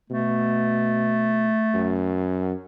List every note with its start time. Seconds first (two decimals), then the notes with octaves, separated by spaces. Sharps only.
0.10 B2 A3
1.74 F#2